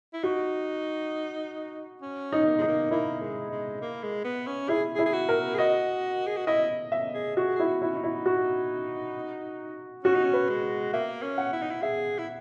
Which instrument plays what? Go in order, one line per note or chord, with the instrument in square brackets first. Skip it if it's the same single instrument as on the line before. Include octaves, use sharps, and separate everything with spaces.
[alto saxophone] E4
[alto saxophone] D#4 [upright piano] F#4
[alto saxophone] C#4
[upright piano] D#4
[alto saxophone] A#3
[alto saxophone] G#3 [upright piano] D#4
[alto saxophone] A#3
[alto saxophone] A#3 [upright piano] E4
[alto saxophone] G#3
G#3
A#3
G#3
B3
C#4
[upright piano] E4 [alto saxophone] G#4
[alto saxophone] G#4
[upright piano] E4
[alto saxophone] G#4
F#4
[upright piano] A#4
[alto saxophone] G#4
[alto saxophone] F#4 [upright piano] D#5
[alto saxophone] G#4
F#4
[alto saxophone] E4 [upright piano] D#5
[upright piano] E5
[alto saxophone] G#4
[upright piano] F#4 [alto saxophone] G#4
[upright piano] E4 [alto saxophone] G#4
[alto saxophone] F#4
[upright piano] E4
[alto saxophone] C#4
D#4
[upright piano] E4
F#4
[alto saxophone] C#4 [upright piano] F#4
[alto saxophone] D#4
C#4
[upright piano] B4
[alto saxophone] G#3
[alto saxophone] A#3 [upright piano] E5
[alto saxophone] C#4
[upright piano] F#5
[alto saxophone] E4
D#4
E4
[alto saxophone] G#4 [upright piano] E5
[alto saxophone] E4